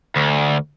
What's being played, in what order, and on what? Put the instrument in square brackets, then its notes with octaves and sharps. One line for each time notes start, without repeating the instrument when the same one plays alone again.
[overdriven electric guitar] D2